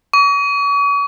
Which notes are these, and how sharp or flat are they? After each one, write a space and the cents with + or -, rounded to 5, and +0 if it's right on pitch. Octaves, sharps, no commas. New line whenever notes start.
C#6 +40